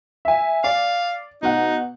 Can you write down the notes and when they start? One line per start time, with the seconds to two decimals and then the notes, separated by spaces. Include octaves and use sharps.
0.25 E5 G#5
0.64 D5 F5
1.42 B2 D#4 F#5